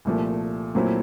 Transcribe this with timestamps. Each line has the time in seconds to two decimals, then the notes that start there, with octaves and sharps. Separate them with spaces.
0.05 C2 A#2 F3 A3
0.75 A#2 F#3 A3 C4 E4